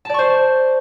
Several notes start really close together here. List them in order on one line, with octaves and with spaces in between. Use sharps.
A5 D5 C#6 C5